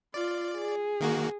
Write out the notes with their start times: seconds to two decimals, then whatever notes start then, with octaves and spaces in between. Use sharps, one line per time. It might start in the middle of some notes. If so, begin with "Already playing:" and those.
0.14 F4 D5
0.57 G#4
1.00 D#3 A#3 F#4